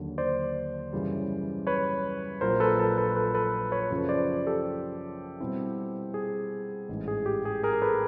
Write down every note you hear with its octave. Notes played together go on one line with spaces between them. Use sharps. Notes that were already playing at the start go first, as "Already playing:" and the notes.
Already playing: D#2 D3 F#3
C5 D5
F#2 C#3 E3 G3
B4 C#5
A#1 A#2 F#3 A#4 C5
A4 B4
A4 B4
A4 B4
A4 B4
A4 B4
B4 C#5
F#2 C#3 F3
C5 D5
G4 A4
B2 G3 C4 E4
G#4
A1 G#2 E3
G#4
G4
G#4
G#4 A#4
A4 B4